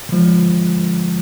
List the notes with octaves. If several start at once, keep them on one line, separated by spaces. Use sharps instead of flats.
D3 F3 G#3